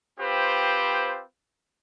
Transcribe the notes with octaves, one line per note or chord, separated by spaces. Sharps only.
C4 F4 G4 B4 C5